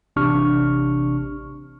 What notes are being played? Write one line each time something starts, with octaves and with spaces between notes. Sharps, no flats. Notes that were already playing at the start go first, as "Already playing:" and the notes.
A1 C3 D4 C#6 F6